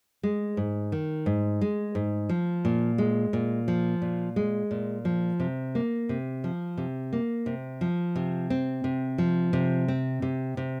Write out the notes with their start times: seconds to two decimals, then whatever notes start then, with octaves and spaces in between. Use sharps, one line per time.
0.23 G#3
0.57 G#2
0.92 D#3
1.26 G#2
1.61 G#3
1.95 G#2
2.29 F3
2.65 A#2
2.98 G#3
3.33 A#2
3.68 F3
4.02 A#2
4.36 G#3
4.71 A#2
5.05 F3
5.40 C3
5.75 A#3
6.09 C3
6.44 F3
6.77 C3
7.13 A#3
7.46 C3
7.81 F3
8.16 C3
8.50 C4
8.84 C3
9.18 F3
9.53 C3
9.88 C4
10.22 C3
10.57 C3